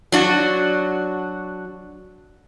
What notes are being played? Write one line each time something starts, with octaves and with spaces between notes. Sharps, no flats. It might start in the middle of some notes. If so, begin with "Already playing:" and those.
F#3 D4 F#4